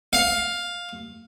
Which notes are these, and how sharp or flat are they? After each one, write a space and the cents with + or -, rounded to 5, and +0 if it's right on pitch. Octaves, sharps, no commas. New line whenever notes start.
F5 +10